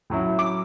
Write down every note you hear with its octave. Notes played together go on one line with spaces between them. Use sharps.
A2 F#3 C#4 E4
D6